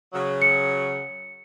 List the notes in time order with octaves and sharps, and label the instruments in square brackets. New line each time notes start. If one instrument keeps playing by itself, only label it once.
[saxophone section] C#3 F#3
[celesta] C#7